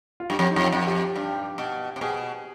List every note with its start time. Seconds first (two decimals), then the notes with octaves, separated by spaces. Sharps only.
0.20 F4
0.30 G2 G4
0.39 F2
0.51 D#4
0.56 F2 F4
0.72 F2
0.87 G4
1.16 G2
1.58 B2
1.96 C3
2.01 B2 G#4